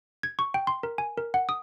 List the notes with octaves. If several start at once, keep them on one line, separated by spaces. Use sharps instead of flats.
G#6
C#6
G5
C6
A#4
G#5
A#4
F#5
D#6